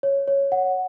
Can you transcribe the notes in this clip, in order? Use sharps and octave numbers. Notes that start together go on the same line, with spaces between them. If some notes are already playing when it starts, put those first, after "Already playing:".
C#5
C#5
F#5